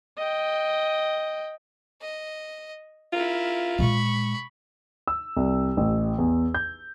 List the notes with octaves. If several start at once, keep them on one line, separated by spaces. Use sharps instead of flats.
D#5 G5
D#5
E4 F4 A#4
A#2 G#3 B5 C#6
E6
C2
A1
E2
G6